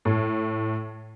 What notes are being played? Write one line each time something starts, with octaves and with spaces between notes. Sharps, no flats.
A2